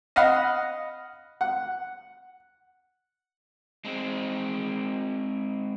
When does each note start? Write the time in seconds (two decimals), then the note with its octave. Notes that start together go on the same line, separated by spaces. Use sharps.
0.16 D#5 F5 F#5 B5 F6
1.41 F#5
3.85 G#3 C4